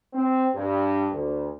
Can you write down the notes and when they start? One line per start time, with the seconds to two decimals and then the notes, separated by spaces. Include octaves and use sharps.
0.13 C4
0.53 G2
1.10 D2